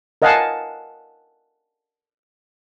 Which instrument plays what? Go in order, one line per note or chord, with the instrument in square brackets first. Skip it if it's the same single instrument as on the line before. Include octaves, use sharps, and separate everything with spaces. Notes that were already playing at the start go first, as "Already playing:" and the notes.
[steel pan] A#4 D#5 F5 F#5 G#5 A5